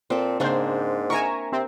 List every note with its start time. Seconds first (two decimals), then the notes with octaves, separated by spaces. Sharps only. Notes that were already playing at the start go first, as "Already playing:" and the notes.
0.10 A#2 C4 A4
0.40 G#2 C#3 A#3 C4 D4 C5
1.10 A#4 E5 G#5 A#5 C#6
1.52 C3 C4